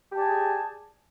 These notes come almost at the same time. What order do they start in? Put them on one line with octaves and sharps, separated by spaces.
G4 A5 D5 G#5 G#4